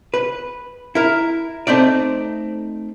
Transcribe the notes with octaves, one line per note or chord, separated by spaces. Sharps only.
B4
E4 A#4
A3 C4 D#4 D5